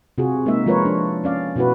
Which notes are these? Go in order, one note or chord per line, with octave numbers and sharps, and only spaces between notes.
C3 F4 F#4 G#4
G#3 A#3 D#4 E5
F3 G#3 F4 A#4 B4 C#5
D4
C#4 D5 F5
B2 B3 E4 F#4 B4